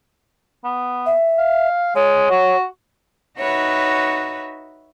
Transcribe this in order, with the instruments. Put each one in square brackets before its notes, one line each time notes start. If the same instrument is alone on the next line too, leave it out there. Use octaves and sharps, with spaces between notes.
[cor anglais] B3
[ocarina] E5
[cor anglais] F5
[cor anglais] G#3 [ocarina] C#5
[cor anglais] F#4
[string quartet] D#4 F#4 B4 C#5 E5